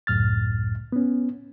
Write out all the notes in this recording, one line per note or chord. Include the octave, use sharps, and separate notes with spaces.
C#2 F#2 A2 F6 A6
B3 C#4